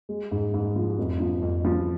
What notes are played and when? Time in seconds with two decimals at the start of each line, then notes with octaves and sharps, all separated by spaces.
0.09 G#3
0.31 G#2
0.54 G#2
0.76 F3
0.98 F1
1.20 F3
1.42 F2
1.65 F3